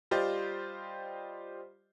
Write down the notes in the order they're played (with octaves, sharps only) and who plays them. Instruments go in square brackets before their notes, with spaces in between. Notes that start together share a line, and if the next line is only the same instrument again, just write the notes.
[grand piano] G3 F4 G4 C5 D5 D#5